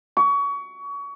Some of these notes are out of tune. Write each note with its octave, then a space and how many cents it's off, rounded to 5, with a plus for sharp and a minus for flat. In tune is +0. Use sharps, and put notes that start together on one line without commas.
C#6 +30